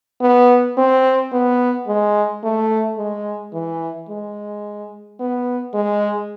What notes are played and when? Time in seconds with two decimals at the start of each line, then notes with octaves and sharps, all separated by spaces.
0.22 B3
0.77 C4
1.32 B3
1.87 G#3
2.43 A3
2.98 G#3
3.53 E3
4.09 G#3
5.20 B3
5.74 G#3